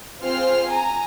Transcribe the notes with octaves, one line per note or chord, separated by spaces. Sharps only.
C4 F4 G#4 C5 F6 C7
G#5 A#5